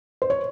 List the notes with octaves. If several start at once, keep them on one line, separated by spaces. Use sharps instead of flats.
C5
C#5